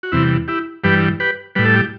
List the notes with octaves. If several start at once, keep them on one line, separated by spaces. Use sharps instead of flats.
F#4
E2 C3 E3 G3 C4 E4
E4 G4
G2 E3 G3 G4 B4
G4 B4
A2 G3 B4
A4
G4